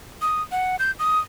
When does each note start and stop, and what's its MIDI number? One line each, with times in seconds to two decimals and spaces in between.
0.22 0.42 87
0.52 0.76 78
0.79 0.91 91
0.99 1.19 87